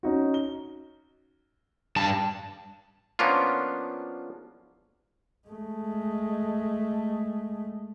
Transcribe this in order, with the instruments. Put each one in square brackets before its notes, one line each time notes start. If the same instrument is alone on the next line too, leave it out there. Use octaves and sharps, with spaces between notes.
[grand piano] C#4 D#4 F#4
G7
[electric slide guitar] G2 A5
[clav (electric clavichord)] F3 A#3 B3 C#4 D4 F4
[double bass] G#3 A3